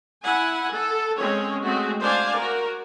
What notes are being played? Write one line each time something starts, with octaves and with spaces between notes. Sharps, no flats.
E4 F#5 G#5
A4
G#3 C4 C#4 C#5
G#3 A3 C4 F#4
D4 C5 D5 F5 G#5
F#4 A#4